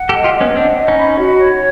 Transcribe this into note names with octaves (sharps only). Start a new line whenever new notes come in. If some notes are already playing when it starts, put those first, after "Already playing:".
Already playing: F#5
G4 A4
D#5
F4 G4
D#5
B3 C#4
C4 D4 F#5
D#5
C#4 D#4
B5
F#4
C#5